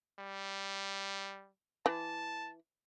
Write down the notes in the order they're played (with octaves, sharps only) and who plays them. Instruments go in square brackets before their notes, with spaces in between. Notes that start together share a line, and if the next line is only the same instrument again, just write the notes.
[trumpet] G3
[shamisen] E3 [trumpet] A5